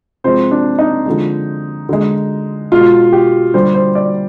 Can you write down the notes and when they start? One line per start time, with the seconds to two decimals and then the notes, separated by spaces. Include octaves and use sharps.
0.24 C3 F3 G#3 C5
0.51 D4
0.79 D#4
1.06 D3 F3 G#3
1.89 D3 G#3
2.72 B2 G#3 F4
3.13 G4
3.54 D3 G3 C5
3.74 C5
3.95 D5